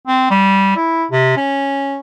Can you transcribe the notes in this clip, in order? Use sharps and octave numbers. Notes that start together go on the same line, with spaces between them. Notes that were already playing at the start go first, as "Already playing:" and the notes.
C4
G3
E4
C3
C#4